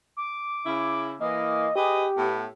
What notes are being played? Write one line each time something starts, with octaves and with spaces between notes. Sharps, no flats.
D6
C#3 E4
E3 A#3 D#5
G4 G#4 B4 D#5
A2 B3